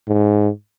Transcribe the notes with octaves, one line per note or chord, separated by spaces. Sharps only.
G#2